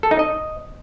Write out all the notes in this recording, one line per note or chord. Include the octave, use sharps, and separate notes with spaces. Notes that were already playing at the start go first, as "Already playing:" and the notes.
A4
D#4
D#5